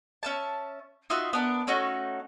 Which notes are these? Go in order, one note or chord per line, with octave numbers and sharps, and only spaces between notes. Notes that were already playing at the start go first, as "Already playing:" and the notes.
C#4 E5 A5
D#4 F4 F#4 E5
B3 D4 A#4
A3 C#4 D#4 F#4